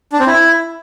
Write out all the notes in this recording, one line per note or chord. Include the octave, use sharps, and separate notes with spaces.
D4
C4
E4